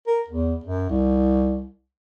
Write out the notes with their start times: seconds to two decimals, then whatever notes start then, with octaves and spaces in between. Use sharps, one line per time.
0.07 A#4
0.28 E2
0.64 F#2
0.90 C2